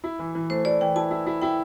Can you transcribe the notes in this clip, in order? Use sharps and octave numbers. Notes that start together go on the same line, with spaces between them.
E4
E3
E3
A3 C5
E4 D5
E3 G5
E4 A5
E4
E4
E4 G5